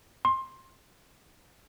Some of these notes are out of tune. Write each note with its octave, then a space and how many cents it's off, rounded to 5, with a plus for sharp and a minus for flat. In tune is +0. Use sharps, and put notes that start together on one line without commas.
C6 +20